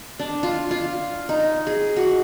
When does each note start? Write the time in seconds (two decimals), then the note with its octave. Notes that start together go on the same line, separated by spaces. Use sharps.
0.19 D4
0.43 F4
0.71 F4
1.29 D#4
1.67 G#4
1.96 F#4